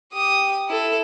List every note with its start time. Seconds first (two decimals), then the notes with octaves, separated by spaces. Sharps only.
0.13 G4 D#6
0.68 E4 A4